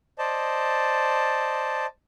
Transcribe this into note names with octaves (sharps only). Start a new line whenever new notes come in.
C5 D5 D#5 A5